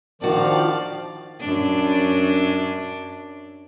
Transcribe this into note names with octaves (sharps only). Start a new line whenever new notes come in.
D#3 F3 D4 F#4 D5 F5
F#2 D4